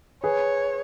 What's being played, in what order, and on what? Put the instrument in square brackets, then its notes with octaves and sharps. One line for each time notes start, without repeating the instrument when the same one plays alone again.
[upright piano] G#4 B4 [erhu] C#5